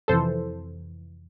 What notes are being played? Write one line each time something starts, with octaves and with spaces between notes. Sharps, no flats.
F2 C3 E3 A4 C5